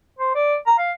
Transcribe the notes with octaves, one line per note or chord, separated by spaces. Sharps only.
C5
D5
A#5
F5